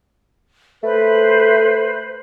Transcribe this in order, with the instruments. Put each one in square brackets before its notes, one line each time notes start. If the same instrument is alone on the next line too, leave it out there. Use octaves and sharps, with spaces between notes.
[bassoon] A3 [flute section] B4 C5 B5